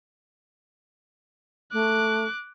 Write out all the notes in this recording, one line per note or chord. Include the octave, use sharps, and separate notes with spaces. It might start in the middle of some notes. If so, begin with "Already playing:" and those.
A3 D6 F#6